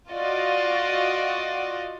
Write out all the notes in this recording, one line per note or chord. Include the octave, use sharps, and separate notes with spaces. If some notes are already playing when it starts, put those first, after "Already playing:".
F4 F#4 D5 D#5